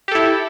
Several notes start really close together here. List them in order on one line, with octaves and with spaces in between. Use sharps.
G4 A4 E4